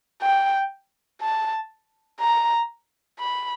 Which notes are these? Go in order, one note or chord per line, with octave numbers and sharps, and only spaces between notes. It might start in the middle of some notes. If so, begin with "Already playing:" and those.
G5
A5
A#5
B5